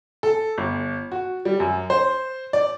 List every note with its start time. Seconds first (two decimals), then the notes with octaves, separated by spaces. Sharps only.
0.23 A4
0.58 G1
1.12 F#4
1.45 G3
1.60 F#2
1.90 C5
2.53 D5